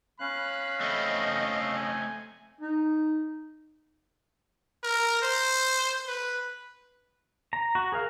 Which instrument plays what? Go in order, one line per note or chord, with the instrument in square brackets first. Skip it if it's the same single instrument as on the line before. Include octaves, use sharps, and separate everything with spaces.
[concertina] C#4 F5 [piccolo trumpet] B5 [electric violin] F#6
[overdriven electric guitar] A3 C4 [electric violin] D#5
[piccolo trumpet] G#5
[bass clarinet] D#4
[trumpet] A#4
C5
B4
[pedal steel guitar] A#5
F#4
G#4 A#4 F5